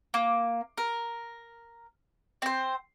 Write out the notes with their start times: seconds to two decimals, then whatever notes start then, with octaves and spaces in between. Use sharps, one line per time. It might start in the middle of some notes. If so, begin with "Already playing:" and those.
0.14 A#3
0.78 A#4
2.42 C4 C5